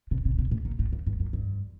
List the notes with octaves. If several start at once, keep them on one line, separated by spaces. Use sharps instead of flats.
C3
C3
B2
A2
A#2
A2
F2
G2
F#2
G2